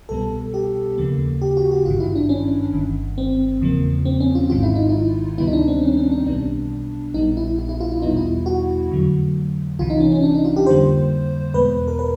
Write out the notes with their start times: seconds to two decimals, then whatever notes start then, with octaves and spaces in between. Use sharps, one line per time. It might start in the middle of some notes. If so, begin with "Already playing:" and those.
0.09 C2 B2 G3 B3 A4
0.54 G4
0.98 D#2 C#3 F3 A#3
1.41 G4
1.57 F#4
1.71 G4
1.85 G#1 F4
1.88 G2 D#3
2.00 E4
2.15 D4
2.29 C#4
2.73 G1 G2 D#3
3.18 C4
3.61 E2 C#3 F3 A#3
4.05 C4
4.20 C#4
4.35 F4
4.50 G#1 G#2 D#3 G#3 F4
4.63 E4
4.75 D#4
4.89 E4
5.38 D2 C3 D#3 G3 B3 E4
5.47 D#4
5.53 D4
5.68 C4
5.83 C#4
5.97 C#4
6.12 D4
6.26 B1 B2 G3 B3 D4
7.14 A#1 A#2 G3 B3 D#4
7.37 E4
7.59 E4
7.69 E4
7.80 F4
7.91 E4
8.02 E2 B2 G3 B3 D#4
8.17 E4
8.46 F#4
8.91 F2 D3 F#3 A3
9.79 C2 C3 E3 F4
9.90 D#4
10.00 C#4
10.12 C#4
10.23 D4
10.34 D#4
10.45 F4
10.56 G4
10.66 F2 D3 G3 A#3 C5
11.54 E2 B2 G#3 B3 B4
11.88 A#4
11.99 B4